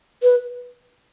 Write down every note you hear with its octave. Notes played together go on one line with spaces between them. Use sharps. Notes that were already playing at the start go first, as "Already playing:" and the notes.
B4